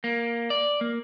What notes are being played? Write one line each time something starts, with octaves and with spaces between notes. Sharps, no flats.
A#3
D5
A#3